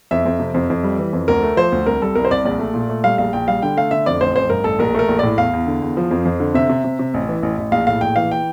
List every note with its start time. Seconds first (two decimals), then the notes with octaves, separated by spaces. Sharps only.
0.11 F2 E5
0.25 F2
0.40 C3
0.54 F2
0.70 F2
0.83 G3
0.99 E3
1.13 F2
1.28 D2 A#4
1.43 A3
1.57 F3 C5
1.72 D2
1.86 C2 A#4
2.02 G3 A4
2.15 C2 A#4
2.25 C5
2.31 C2 D5
2.45 A#1 D5
2.59 A3
2.74 A#2
2.89 A3
3.04 G3 F5
3.18 A#1 F5
3.33 A#1 G5
3.48 G3 F5
3.62 D3 G5
3.77 A3 F5
3.91 D3 E5
4.06 F2 D5
4.20 A1 C5
4.36 A1 C5
4.50 G2 A#4
4.64 A1 A4
4.79 A#1 A#4
4.94 A3 A#4
5.08 A#1
5.19 A2 D5
5.37 E2 F5
5.53 E2
5.67 D3
5.82 E2
5.97 F3
6.11 F2
6.25 F2
6.40 D3
6.55 C3 E5
6.70 C3
6.84 C3
6.99 C3
7.14 A1
7.29 E3
7.43 A1
7.58 A1
7.72 A#1 F5
7.87 A2 F5
8.01 A#1 G5
8.16 E3 F5
8.31 G5